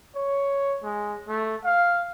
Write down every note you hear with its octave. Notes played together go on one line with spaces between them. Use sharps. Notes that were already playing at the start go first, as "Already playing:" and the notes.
C#5
G#3
A3
F5